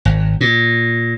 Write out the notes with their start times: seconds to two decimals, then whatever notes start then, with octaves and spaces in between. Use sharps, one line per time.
0.05 G#1
0.41 A#2